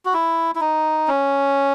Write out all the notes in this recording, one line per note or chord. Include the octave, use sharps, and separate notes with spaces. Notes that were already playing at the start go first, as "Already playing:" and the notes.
F#4
E4
E4
D#4
C#4